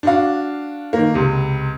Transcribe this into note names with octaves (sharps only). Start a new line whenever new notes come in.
D4 F#4 F5
D#3 A#3
C#2 C3